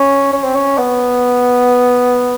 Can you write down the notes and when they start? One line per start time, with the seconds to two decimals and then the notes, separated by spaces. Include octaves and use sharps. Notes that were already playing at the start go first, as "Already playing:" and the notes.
Already playing: C#4
0.33 C#4
0.44 C4
0.55 C#4
0.78 B3